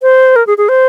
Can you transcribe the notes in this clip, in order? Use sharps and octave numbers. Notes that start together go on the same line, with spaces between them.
C5
A#4
G#4
G#4
C5